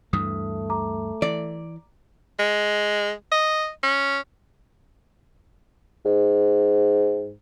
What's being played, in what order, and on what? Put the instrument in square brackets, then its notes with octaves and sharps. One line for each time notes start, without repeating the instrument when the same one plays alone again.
[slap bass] D2 G2 E3 [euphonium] A3 [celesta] D#6
[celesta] A#5 D6
[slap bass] E3 [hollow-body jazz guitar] D5
[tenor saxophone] G#3
D#5
C#4
[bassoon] G#2